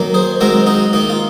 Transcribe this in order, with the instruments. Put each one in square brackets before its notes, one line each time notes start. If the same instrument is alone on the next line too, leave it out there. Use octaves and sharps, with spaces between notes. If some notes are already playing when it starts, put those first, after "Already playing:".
Already playing: [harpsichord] D#3 F#3 A#3
G#4 C5
D#3 G#3 C4 F#4 A#4
D#4 F#4
D#3 A#3 D#4
F4